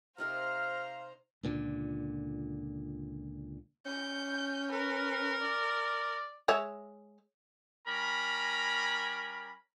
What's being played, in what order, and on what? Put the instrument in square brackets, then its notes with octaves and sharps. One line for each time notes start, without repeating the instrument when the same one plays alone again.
[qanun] C3 D#4 A#4 [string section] C5 A#5 [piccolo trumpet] F5 [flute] F6
[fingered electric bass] C#2 A#2 D3
[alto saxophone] C#4 [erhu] G6
[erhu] A#4 [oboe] B4
[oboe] D5
[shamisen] G#3 C#5 E5
[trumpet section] G3 C#4 A#4 A#5 B5